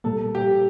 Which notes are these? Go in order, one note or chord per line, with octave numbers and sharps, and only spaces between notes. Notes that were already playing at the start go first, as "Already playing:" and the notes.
A#2 G3 A#3 A4
G4